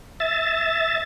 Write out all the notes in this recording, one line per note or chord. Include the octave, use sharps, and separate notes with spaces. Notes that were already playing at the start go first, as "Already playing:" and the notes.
E5 A6